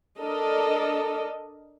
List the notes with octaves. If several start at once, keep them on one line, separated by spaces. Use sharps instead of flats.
D4 A4 A#4 D#5